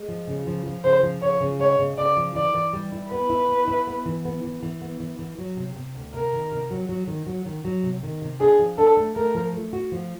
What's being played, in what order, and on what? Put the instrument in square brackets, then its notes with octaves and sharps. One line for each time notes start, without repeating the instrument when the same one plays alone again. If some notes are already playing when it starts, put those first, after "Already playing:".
Already playing: [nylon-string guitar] G#3
F3
C#3
F3
F3
[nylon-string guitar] C#3 [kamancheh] C5
[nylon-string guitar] F3
[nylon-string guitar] C#3 [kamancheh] C#5
[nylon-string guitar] C#3
[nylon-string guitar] G#3 [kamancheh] C#5
[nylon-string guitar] C#3
[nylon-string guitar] C#3 [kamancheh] D5
[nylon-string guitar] F3
[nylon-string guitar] E3 [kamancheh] D5
[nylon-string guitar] E3
G3
E4
[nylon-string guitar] B3 [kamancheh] B4
[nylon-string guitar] E4
B3
E4
B3
E3
B3
E3
E3
B3
E3
E3
F#3
C3
C3
D2
[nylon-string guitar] C3 [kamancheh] A#4
[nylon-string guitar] D#3
C3
F#3
F#3
D#3
F#3
D#3
F#3
C3
D#3
C3
[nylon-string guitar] D4 [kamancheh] G#4
[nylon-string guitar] F3
[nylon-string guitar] D4 [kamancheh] A4
[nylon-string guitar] A3
[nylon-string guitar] A3 [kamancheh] A#4
[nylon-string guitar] F3
A3
F#4
F3